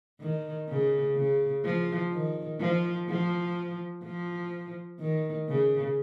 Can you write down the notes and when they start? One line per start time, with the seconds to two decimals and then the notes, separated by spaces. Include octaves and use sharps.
0.21 D#3
0.69 C#3
1.17 C#3
1.65 F3
2.13 D#3
2.60 F3
3.09 F3
4.04 F3
5.00 D#3
5.49 C#3